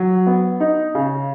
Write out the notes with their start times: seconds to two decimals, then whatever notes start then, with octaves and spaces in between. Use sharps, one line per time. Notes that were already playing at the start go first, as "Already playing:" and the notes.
Already playing: F#3
0.27 B3
0.60 D#4
0.95 C#3